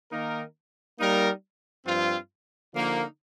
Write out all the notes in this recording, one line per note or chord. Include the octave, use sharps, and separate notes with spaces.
D#3 A#3 D#4 A#4
G3 A#3 D#4 A#4
G2 F3 C4 F4
D3 F3 A#3 D#4